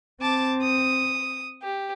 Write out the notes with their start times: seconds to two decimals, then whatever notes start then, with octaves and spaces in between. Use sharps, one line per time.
0.22 C4 A5 D6
0.62 D#6
1.63 G4